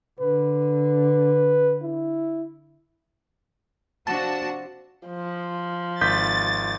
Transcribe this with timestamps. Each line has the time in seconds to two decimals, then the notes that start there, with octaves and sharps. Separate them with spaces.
0.20 D3 B4
1.82 E4
4.07 C3 F3 D4 F#4 A5
5.08 F3
6.01 G#1 G6 A6 B6